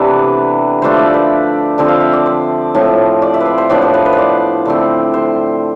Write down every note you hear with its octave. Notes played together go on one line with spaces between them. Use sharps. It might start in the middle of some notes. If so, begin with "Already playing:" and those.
Already playing: C3 E3 A3 B3 D4 B4 D5 E5
D3 F3 A3 D4 C5
D5 E5
B4
D3 F3 C4
F5
E5
D5
C5
A2 F3 C4
D5
E5
B4
C5
C5
A2 F3 B3 D4 D5
C5
B4
B4
C5
D5
D3 A3 C4
C5